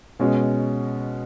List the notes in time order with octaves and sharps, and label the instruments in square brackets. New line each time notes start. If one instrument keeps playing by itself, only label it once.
[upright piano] B2 G#3 C#4